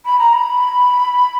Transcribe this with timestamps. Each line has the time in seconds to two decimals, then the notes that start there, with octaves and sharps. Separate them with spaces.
0.05 B5
0.19 A#5
0.33 B5